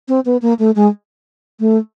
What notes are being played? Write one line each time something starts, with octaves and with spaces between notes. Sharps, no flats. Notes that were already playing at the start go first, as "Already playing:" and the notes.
C4
B3
A#3
A3
G#3
A3